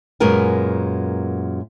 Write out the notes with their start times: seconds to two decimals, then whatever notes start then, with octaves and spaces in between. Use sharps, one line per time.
0.20 F#2 A#2 G#3 B3 A#4 G#5